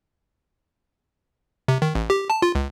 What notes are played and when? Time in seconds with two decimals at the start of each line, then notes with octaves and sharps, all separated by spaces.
1.68 C3
1.82 D#3
1.95 A1
2.10 G4
2.30 A5
2.42 F4
2.55 C#2